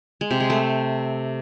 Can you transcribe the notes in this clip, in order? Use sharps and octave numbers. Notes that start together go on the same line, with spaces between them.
G#3
C3
G#3
A3